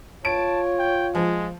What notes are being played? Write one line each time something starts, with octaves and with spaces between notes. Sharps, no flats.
F4 C#5 A5 D7
G5
F3 G#3